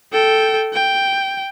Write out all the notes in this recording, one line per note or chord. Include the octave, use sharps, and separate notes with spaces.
A4 G5
G5